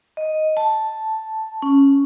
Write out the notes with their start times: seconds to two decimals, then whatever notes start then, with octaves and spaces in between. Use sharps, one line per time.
0.17 D#5
0.57 A5
1.62 C#4